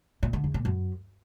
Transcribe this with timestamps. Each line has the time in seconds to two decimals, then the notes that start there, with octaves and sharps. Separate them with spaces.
0.23 A#2
0.33 D3
0.44 E2
0.54 A#2
0.65 F#2